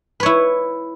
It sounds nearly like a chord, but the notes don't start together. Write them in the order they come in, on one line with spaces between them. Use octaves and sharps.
B4 C#5 E4